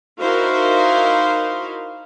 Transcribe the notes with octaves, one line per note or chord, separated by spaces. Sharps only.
D#4 E4 F#4 A#4 C5 F5